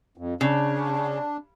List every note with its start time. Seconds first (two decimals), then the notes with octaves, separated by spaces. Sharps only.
0.18 F2
0.41 C#3 D4